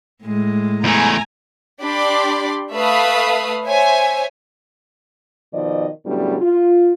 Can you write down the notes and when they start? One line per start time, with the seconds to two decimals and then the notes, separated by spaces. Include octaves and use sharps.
0.23 A2 G#3
0.84 E2 A3 G#5 A#5
1.81 D4 G4 D5 B5 C6 D6
2.73 A3 B4 E5 F5 B5 D#6
3.65 C5 C#5 E5 G#5
5.54 B2 D#3 F3 D5 D#5
6.06 A2 C#3 F#3 G3 B3 D4
6.41 F4